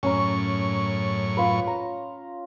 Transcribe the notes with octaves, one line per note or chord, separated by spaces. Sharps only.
F#2 A2 C#4 A#5 C#6
F4 B4
A#5